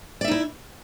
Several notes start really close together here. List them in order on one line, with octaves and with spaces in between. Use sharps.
D5 E5 D#4 E4